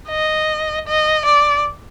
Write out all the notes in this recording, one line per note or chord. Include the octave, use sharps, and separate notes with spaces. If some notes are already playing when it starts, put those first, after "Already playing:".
D#5
D#5
D5